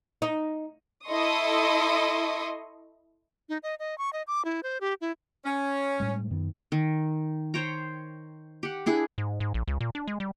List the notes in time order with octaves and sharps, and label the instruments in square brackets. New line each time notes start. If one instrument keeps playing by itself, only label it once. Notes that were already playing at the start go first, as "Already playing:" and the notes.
[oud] D#4
[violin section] E4 A4 D#5 C6 C#6 D#6
[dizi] D#4
D#5
D#5
C#6
D#5
D6
E4
C5
G4
E4
[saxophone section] C#4
[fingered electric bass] A2 G3 G#3
F#2 D#3 B3
[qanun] D#3
C5 C#5 G5 A#5
G4 F#5
D4 E4 G#4
[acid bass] G#2
G#2
A#1
C#2
A#2
D4
G#3
G3